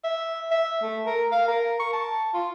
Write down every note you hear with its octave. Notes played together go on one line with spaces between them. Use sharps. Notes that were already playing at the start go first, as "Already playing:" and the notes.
E5
E5
A3
A#4
F5
A#4
C#6
A5
F4